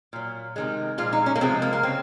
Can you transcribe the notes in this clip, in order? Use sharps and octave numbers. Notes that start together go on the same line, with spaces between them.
A#2 F#3
C3 D#3 G#3
A#2 F3 G#3 F4
D#4
C#4
A#3
C3 F3 G#3 C4
A#3
A#3
C#3 C4